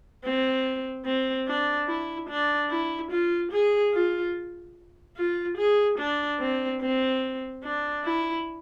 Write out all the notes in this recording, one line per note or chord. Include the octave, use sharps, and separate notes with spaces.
C4
C4
D4
E4
D4
E4
F4
G#4
F4
F4
G#4
D4
C4
C4
D4
E4